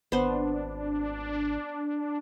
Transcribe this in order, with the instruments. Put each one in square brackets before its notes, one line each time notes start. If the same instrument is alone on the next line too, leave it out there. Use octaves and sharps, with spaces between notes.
[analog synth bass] G#1 [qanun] B3 C5 [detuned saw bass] D4